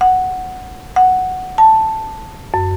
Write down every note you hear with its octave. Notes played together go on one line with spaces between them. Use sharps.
F#5
F#5
A5
F#2